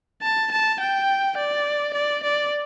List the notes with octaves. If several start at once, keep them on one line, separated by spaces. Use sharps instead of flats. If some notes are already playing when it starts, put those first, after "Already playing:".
A5
A5
G5
D5
D5
D5